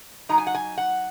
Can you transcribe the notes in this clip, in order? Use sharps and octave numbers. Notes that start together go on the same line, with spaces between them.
F#3 D#4 A#5
G#5
F#5
G#5
F#5